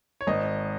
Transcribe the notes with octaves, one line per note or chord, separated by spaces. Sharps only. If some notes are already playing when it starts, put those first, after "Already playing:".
C#5
G#1 D#5